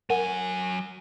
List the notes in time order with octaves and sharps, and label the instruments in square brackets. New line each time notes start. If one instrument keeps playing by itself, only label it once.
[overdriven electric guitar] F#3 G#5 [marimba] A#4 F#5